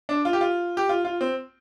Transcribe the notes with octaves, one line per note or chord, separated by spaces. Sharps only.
D4
F4
G4
F4
G4
F4
F4
C4